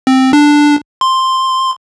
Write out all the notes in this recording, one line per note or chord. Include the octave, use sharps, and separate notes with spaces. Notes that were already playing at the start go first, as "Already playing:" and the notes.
C4
D4
C6